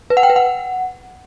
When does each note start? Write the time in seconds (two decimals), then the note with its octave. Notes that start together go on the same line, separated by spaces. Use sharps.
0.10 B4
0.17 F#5
0.23 G5
0.30 B4
0.36 F#5